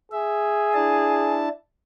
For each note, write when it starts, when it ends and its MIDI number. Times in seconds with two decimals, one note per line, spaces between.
0.12 1.45 68
0.12 0.74 76
0.74 1.49 62
0.74 1.49 64
0.74 1.49 81